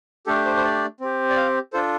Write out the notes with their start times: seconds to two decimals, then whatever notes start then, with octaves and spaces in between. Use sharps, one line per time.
0.27 A3 D4 G4 A4
0.46 C5
0.57 C5
0.64 D5
1.00 C4 G4
1.30 D5
1.36 F5
1.73 D4 F4 A4 C5